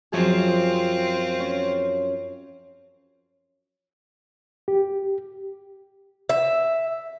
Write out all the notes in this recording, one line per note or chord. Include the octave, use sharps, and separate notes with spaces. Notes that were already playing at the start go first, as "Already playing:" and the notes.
F#2 F3 C4 F4 G#4
C#4
G4
E5